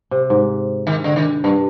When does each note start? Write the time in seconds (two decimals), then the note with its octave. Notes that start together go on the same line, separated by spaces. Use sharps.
0.11 C3
0.30 G#2
0.87 D#3
1.04 D3
1.16 D#3
1.44 G2 A#2